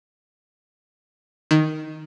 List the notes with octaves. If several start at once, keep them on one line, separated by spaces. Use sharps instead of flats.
D#3